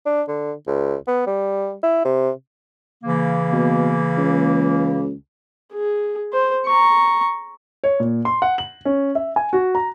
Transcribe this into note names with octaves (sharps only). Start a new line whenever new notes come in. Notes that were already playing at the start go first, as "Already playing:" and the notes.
D4
D3
C#2
B3
G3
E4
C3
C#3 E3 A#3
B2
C#2
G#4
C5
A#5 C#6
C#5
A#2
C6
F#5
F#7
C#4
E5
G#5
F#4
A#5